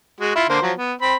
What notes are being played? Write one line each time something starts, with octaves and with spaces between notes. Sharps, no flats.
G#3 F#4
E4 F4
D3 A#3 C5
F3 F#3
B3
C4 B5